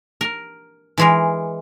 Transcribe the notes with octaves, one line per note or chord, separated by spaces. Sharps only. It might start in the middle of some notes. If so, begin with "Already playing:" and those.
A#4
E3 G#3 A#4